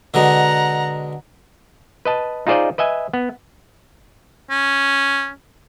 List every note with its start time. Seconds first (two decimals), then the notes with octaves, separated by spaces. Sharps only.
0.14 B2 D3 G#3 F#5 A#5
2.05 B4 D#5 A5
2.47 D#4 F4 G#4 C5 D5 D#5
2.78 B4 D#5 E5 G#5
3.13 B3
4.50 C#4